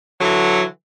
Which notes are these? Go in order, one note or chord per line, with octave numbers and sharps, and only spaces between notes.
D3 E3 F#3